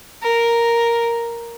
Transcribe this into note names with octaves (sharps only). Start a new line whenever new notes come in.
A#4